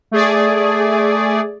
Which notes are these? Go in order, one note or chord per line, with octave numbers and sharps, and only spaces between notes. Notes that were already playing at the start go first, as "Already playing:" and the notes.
A3 G#4 D5